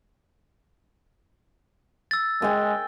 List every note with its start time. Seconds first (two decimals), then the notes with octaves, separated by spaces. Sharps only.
2.11 E6 A6
2.42 G#3 G5 G#5